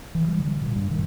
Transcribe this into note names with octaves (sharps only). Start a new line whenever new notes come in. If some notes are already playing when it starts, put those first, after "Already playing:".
E3
G3
D3
A#2
G2
D#3